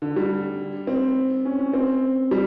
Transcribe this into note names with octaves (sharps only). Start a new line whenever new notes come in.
D3
G3
C4
C#4
C#4
C4
G3